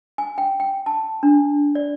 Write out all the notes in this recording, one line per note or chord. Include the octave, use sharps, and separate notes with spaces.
G#5
G5
G5
A5
D4
D5